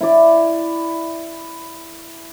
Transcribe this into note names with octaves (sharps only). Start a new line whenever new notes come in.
E4 D5